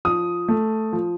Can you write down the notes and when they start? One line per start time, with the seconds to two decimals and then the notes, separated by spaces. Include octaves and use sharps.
0.05 F3 D#6
0.48 A3
0.93 F3